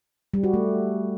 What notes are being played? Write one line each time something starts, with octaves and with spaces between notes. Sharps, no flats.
G3
F#4
A3